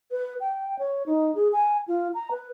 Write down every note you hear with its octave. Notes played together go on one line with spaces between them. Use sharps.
B4
G5
C#5
D#4
G#4
G#5
F4
A#5
B4